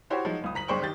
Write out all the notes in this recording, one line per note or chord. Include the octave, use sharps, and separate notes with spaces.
E4 F#4 G4 C5 C#5
F3 F#3 G#3 D#4
F#1 C#2 D#6
F#1 A#5 B6 F#7
F#1 G#3 D4 C5 G5 C#6
D#3 G4 G6 A6